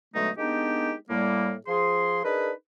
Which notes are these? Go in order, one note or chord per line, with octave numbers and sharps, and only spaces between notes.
B2 D3 F#3 G#3 A3 D#4
G#3 A#3 B3 D4 D#4 G4
A2 G3 A#3
F3 G#4 C6
D4 D#4 G#4 A#4 B4